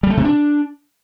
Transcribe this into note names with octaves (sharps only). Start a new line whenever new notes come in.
G3
A3
C3
D4